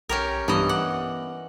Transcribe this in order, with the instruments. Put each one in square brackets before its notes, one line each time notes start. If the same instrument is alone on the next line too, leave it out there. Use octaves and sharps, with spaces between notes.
[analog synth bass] B1 [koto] C#4 G4 A#4
[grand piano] G2 [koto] E3 D#5 [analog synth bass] B3
[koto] F#5 [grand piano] D6